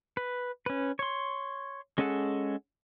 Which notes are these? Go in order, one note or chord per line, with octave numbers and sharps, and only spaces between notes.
B4
C#4 B4
C#5 C6
G#3 C#4 G#4 A4 F#5